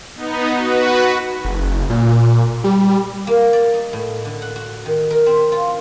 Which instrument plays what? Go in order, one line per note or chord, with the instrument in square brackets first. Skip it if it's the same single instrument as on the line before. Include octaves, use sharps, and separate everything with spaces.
[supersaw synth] B3 D#4
F#4 B4
[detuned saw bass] F#1
A#2
G3
[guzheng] A#3
D5
D#4
A2
D3
F#5
F#4
D#3
A#4
C4
F4